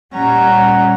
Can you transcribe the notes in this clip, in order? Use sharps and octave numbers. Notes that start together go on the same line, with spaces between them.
A#2 G3 C#4 F#5 A#5